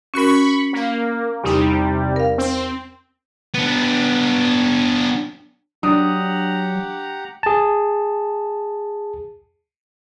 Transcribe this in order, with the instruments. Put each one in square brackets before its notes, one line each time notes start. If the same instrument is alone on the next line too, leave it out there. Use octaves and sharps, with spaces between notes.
[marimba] C#4 F#4 A#4 [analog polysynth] B5 C#6
[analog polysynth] A#3
[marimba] E2 D#4 [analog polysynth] C3 G3
[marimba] A#4 F5
[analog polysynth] C4
[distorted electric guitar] B3 D4
[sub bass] F#3 [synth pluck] D4 [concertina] G4 F#5 A#5 [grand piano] D#6
[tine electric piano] G#4 A5